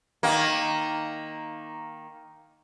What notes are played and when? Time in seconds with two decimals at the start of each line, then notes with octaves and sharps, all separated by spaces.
0.23 D#3 A#3